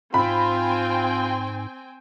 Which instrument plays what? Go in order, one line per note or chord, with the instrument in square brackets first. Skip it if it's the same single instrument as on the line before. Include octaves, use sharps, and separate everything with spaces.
[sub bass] G#2 [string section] C4 G5 G#5 [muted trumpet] F4 [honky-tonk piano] B5